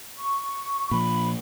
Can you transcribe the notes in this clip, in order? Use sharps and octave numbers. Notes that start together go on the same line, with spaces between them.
C#6
A#2 F3 B5